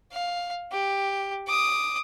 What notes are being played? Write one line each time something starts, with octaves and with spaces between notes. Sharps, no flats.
F5
G4
D6 D#6